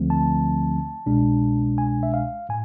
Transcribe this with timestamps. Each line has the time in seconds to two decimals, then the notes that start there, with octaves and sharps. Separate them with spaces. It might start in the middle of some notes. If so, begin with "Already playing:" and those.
Already playing: D2 D3 F3 A3 C4
0.10 A5
1.06 C2 B2 G#3 D4
1.78 G#5
2.03 E5
2.14 F5
2.49 A2 G#5